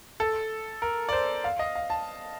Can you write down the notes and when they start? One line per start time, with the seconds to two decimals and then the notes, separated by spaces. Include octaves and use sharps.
0.20 A4
0.82 A#4
1.09 D5
1.13 C5
1.44 F5
1.59 D#5
1.75 F5
1.90 A5